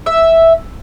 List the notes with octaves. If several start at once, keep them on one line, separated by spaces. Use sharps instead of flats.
E5